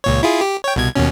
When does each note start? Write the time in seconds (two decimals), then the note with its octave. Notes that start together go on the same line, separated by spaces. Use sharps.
0.04 C#2 A#2 C#5
0.23 E4 F4 G#4
0.41 G4
0.64 C#5 G5
0.76 C2 B2 G#6
0.95 D#2 B2 C#4